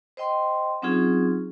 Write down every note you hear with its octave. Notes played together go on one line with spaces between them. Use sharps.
C5 D#5 G5 C6
F#3 C4 C#4 D#4 F4 G#4